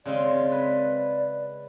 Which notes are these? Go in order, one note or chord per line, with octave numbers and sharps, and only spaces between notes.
C#3 G#3 C4 D5
B4